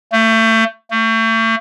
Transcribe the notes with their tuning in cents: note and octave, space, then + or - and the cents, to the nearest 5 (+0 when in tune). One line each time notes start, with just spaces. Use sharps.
A3 +30
A3 +40